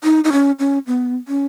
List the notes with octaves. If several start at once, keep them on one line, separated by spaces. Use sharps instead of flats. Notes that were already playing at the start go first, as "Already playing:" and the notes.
D#4
D#4
C#4
C#4
B3
C#4